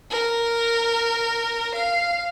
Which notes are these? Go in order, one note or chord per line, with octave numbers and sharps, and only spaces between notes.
A#4
F5